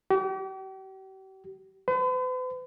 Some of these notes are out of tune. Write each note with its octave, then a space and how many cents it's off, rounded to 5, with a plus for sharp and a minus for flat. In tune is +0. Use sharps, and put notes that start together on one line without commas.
G4 -40
B4 +45